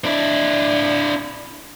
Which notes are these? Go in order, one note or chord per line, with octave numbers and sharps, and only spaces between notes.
D4 E4